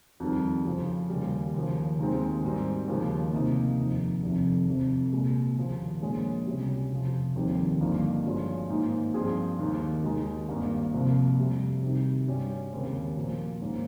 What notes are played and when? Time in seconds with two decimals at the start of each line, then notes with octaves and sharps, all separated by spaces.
0.20 F2 D#3 G3
0.65 F2 C#3 F3
1.10 D#2 C#3 G3
1.54 D#2 C#3 F3
1.99 D#2 D#3 G#3 C4
2.44 G#2 D#3 G3 C4
2.88 D#2 C#3 F3 G#3 D#4
3.33 C3 F3 A#3 D#4
3.78 F1 F2 D#3
4.23 F1 F2 C3 D#3
4.67 F1 F2 C3
5.12 C2 A#2 G#3
5.57 D#2 C#3 F3
6.02 A#1 A#2 G#3 C#4
6.46 C#2 C3 G3 C#4 G4
6.91 F2 C3 F3
7.35 F1 D#2 D#3 G3 C4
7.80 G1 G2 F3 A#3 D#4
8.25 G2 F3 G#3 C#4 F4
8.70 G#2 D#3 A#3 D#4
9.14 G2 F3 C4 F4 G#4
9.59 D#2 D#3 A#3 D#4
10.03 D#2 D#3 G#3 D#4
10.48 G#1 G2 G3 A#3
10.93 C2 C3 F3 A#3
11.38 F2 C3 G3
11.82 C3 D#3 G3
12.27 G2 G3 C#4
12.72 D#2 C#3 G#3 C4
13.17 A#2 F3 A#3
13.62 G#2 D#3 A#3 C#4